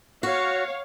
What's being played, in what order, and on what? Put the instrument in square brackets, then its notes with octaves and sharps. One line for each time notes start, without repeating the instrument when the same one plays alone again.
[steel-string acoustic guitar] F#4 [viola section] C#5 F5